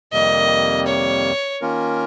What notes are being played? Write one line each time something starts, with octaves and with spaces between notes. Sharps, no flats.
F2 C3 D#3 G3 A#3 D#5
C#5
D#3 A#3 C#4 F4 A#4